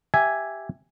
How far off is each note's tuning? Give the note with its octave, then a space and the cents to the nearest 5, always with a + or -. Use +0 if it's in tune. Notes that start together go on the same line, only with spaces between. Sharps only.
G4 +0 E5 +0 G#5 +0